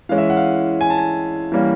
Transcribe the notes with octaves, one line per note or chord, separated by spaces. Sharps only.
E3 G#3 C#4 F5
E5
F#5
F5
G#5
A5
G#5
E3 G3 A#3 C#4